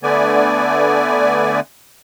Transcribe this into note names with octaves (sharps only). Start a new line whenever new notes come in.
D3 A3 B3 D5 G#5